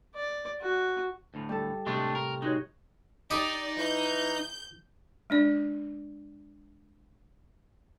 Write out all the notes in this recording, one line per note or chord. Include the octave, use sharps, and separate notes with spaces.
D5
F#4
D2 A2
G3 A4
A2 C3 G#3 A3 D4 C#6
A#4
G#3 D#4 F#4 C#5
D#4 G4 D5 D#5
E3 G6
G#3 D4 D5